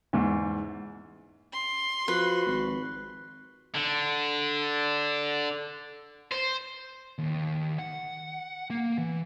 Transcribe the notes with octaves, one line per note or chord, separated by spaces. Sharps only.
E2 G#2
C6
F3 F#4 B4
G#1
D3
C5
D#2
F#5
A#3
E3